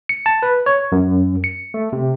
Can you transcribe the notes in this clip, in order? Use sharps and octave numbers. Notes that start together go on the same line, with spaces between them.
C#7
A5
B4
C#5
F#2
C#7
A3
C3